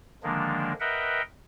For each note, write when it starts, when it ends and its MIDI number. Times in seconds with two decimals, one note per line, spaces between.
0.23 0.73 50
0.23 0.73 51
0.23 0.73 53
0.23 0.73 56
0.23 0.73 58
0.23 0.73 62
0.80 1.22 70
0.80 1.22 71
0.80 1.22 75
0.80 1.22 76
0.80 1.22 78
0.80 1.22 79